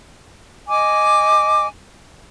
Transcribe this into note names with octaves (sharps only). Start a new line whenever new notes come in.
D#5 G#5 D6